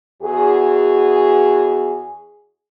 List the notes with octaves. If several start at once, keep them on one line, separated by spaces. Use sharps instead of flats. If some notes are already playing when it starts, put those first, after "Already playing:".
E2 F#4 G#4